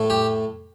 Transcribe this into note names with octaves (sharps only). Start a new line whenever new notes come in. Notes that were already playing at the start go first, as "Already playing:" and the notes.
Already playing: A2 A3
G4